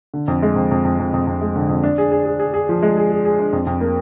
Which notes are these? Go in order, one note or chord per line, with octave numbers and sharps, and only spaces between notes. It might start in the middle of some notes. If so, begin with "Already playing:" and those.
D3
F2
G#3
F2
F2
F2
F2
F2
F2
G#3
D3
F2
D4
G#4
G#4
G#4
G#4
G#4
F3
G#3
G#4
G#4
G#4
D4
F2
F2
A#3